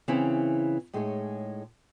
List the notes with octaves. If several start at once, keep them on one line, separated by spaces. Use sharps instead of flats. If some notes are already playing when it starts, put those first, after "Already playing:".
C#3 E3 C4 E4
A2 G#3 D#4 G#4 C#5